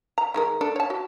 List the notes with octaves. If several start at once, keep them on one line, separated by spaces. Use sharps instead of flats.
A#5
D#3 G#3 A#4
D4 A4
C#5 A5
F#4